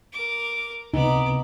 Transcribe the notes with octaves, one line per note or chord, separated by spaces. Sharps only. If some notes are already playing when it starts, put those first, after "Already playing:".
A#4 D6
C#2 C3 B3 D#4 D6